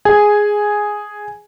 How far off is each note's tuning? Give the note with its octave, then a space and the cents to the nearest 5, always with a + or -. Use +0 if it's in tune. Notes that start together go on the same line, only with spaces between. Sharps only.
G#4 +0 G#5 +0